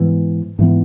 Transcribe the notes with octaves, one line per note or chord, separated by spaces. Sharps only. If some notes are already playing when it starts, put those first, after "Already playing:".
Already playing: G#2 E3 B3
G#2 E3 B3